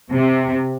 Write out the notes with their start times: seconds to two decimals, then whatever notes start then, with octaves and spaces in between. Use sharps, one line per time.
0.11 C3